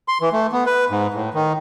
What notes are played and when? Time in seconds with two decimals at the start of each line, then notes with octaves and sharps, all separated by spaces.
0.08 C6
0.21 E3
0.33 A3
0.52 B3
0.66 B4
0.90 G#2
1.14 A2
1.34 D#3